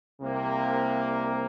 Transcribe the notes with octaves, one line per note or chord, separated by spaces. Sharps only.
C2 C3 A#3